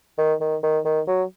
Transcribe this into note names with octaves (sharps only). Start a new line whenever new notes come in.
D#3
D#3
D#3
D#3
F#3